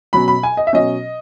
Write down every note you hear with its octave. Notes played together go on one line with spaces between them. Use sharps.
B2 F#3 C#4 B5
B5
G#5
D#5
E5
B2 F#3 C#4 D#5